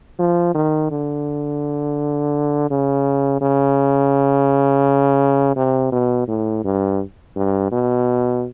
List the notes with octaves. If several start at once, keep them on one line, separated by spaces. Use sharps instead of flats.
F3
D#3
D3
C#3
C#3
C3
B2
A2
G2
G2
B2